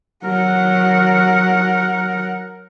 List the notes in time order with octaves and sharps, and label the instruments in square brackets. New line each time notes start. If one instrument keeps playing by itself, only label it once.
[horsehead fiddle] F#3 F#5 [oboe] A#4